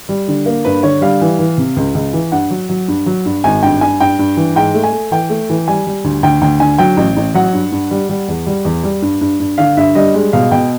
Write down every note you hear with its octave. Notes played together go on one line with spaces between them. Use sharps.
G3
D3
A#3
G2 B4
D3 C#5
G3 F5
E3
E3
C3
C#2
C#2
E3
G2 F#5
F#3
F#3
G2
F#3
G2
G#1 G#5
G2 G5
G2 G#5
G2 G5
G2
E3
G#2 G5
A3
G#5
A3
E3 G5
A3
E3
G3 G#5
G3
D2
D2 G5
D2 G5
D3 G#5
F#3 G5
A1
A1
F#3 F#5
G2
G2
G3
G3
E2
G3
E2
G3
G2
G2
G2
D3 F5
G2 E5
G3 D#5
G#3
B2 F5
B2 G5